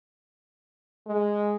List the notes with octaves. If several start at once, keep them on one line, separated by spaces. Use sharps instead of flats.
G#3